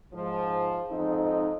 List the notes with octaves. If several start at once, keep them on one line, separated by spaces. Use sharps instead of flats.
G#2 F3
F2 G#2 C4 D#4